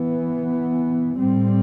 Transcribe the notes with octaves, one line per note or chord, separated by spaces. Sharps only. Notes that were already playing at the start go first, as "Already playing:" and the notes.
Already playing: E3 B3
A2 G3 C4